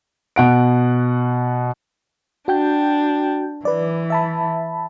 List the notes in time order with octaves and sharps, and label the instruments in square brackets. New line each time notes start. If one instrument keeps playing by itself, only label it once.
[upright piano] B2 F#5 D7
[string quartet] D4 [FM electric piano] F#4 G5 G6
[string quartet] E3 [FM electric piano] B4 D5
[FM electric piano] E5 A5 B5